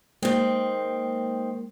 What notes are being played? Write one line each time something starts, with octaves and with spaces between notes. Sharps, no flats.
D#3 G#3 A#3 C4